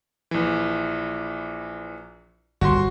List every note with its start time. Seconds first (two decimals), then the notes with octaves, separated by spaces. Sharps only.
0.31 A#1 E3
2.61 G1 F#4 C6